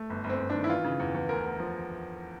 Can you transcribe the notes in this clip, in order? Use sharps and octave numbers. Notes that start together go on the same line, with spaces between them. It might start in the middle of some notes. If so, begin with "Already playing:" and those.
Already playing: A3
G1
G1
C4
G1
D4
D#3
E4
E3 F4
C#3
E2
E2
D2 A#4
D2
F3